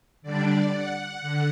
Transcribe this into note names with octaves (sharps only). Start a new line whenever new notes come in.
D3 G3 D4 D5
F#5
D3